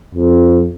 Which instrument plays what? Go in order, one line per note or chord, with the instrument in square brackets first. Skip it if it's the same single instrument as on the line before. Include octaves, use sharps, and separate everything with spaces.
[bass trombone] F2